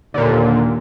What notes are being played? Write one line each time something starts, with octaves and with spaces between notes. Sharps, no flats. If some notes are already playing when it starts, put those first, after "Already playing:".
D#2 A#2 D3